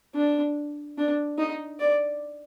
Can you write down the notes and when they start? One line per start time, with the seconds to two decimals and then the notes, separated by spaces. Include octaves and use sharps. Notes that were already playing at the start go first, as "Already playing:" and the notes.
0.15 D4
0.98 D4
1.39 D#4
1.80 D5